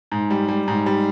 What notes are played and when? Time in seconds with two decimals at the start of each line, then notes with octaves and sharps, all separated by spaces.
0.12 G#2
0.30 G3
0.48 G3
0.68 G#2
0.86 G3